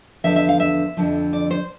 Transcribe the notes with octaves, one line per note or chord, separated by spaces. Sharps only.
E2 D3 F3 E5
E5
F5
E5
F2 D3 F3
D5
C5